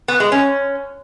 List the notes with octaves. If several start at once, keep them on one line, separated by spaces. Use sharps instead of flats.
B3
G#3
C#4